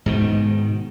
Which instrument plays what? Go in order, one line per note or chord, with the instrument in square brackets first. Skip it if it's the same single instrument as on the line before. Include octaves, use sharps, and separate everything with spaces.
[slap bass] G#2 B2 D#3